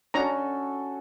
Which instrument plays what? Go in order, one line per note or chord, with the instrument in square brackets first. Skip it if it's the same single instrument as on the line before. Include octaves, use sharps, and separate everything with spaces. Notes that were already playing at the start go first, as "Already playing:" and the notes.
[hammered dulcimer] C#4 F#4 A4 [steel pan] D4 C#5 A#5